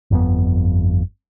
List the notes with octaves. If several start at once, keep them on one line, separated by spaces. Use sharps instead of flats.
G1 F2 B3